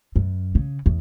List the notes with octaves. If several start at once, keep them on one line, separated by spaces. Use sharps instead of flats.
F#2
C#3
E2